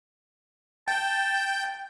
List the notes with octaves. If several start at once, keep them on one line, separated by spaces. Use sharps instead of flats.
G5 A5 G6